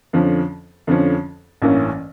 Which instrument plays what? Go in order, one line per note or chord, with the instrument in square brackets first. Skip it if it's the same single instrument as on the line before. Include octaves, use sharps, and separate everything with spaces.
[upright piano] F2 D3 F3 C#4
F2 D3 F3 C#4
A1 G2 E3 A#3 C#4